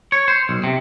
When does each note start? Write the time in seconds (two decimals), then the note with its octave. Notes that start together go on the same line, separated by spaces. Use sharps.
0.12 C#5
0.28 C5
0.49 B1
0.64 C3